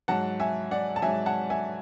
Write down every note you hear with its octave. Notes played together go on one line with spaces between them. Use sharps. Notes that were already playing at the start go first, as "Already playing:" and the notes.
G#2 F#3 F#5 A5
E5 G#5
D5 F#5
A5
G#2 F#3 E5 G#5
F#5 A5
E5 G#5